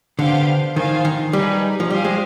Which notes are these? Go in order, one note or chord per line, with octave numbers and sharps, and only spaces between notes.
D3 B3 D4 G4 C5 F5
D#3 F4 C5 F5 G#5
D#3
G3 D#4 G#4 B4
F3
G3 G4 C5 F5 G#5
G#3